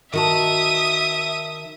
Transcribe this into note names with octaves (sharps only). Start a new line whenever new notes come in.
D#3 F#4 E5 A5 D#6